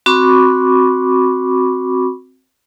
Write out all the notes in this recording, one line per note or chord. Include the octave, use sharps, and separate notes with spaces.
C4 F#4 B5 C#6 D6